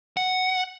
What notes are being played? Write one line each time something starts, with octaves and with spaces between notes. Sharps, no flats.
F#5